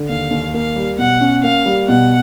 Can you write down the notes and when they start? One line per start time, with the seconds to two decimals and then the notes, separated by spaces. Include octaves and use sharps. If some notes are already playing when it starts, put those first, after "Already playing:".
Already playing: D3
0.09 D#2 F5
0.31 D#2
0.54 A#3 F5
0.76 G3
0.98 B2 F#5
1.21 C#4
1.43 A#3 F5
1.66 G3
1.88 B2 F#5